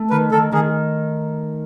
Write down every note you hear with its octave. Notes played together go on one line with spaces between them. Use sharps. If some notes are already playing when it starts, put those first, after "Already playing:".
Already playing: A3
D#3 B4
D#3 A4
D#3 G#4